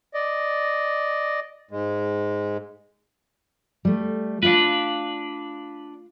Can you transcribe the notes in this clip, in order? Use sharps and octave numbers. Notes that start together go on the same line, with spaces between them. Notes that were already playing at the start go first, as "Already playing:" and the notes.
D5 D#5
G#2 G#3
G3 A3
D4 F4 B4 F5